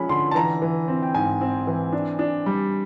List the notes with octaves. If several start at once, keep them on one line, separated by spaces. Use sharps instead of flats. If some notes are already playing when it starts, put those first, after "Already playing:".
Already playing: F3 G#3 C#4 B5
D3 C6
A5
E3 A#5
E3
C4
G5
G#2 G#5
C4
E3
D4
D4
G3